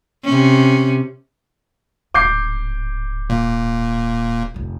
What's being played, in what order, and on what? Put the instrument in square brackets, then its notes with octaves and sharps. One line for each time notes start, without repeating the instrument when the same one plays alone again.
[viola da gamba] C3 C#4
[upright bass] D1 G#2 [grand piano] D6 G6 C7
[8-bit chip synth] A#2
[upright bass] F1 D3